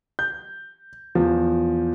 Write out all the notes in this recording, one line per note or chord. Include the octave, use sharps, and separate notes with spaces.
G6
E2 F3